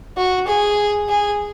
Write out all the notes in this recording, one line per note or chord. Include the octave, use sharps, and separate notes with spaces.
F#4
G#4
G#4